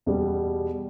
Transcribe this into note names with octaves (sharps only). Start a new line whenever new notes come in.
E2 B2 G3